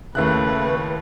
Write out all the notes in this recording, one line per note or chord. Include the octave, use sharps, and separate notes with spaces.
D#2 C#3 A3 E4 B4 F#6